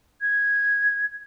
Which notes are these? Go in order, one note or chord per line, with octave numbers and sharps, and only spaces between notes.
G#6